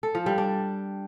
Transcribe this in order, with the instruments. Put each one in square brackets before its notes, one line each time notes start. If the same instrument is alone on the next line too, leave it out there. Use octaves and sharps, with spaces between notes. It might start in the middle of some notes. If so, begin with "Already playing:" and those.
[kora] A4
F3
G3
D4